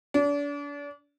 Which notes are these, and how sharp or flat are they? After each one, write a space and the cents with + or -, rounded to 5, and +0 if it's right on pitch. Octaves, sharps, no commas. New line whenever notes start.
D4 -35